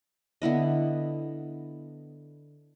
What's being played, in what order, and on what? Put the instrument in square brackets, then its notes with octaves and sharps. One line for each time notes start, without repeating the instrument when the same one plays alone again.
[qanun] D3 B3 E4 D#5